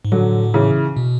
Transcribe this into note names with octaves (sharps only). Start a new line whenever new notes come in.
G#2
A2 D3 F#3
C#3 E3
B2